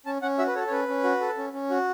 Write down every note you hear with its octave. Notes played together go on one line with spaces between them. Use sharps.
C#4 A5
C#4 F#5
F#4 E5
B4
A4 C#5
C#5
C#4 B4
C#4
F#4
A4
C#4
C#4
F#4